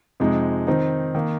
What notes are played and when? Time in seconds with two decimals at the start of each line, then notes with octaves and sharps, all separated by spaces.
0.20 F2 C3 G#3 D#4
0.67 D#3 C4 D#4
1.15 D#3 A#3